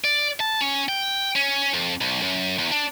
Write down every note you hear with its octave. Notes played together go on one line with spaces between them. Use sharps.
D5
A5
C#4
G5
C#4
F2
B1
F#2
E2
D4